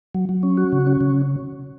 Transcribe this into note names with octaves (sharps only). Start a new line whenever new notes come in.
F#3
F#3
C#4
F#4
C#3
C#4
C#3